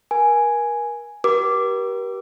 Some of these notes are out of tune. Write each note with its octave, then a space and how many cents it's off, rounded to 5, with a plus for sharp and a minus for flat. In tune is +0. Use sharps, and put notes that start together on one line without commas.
A#4 +35 G#5 +0
G4 -25 A#4 +45 D6 +0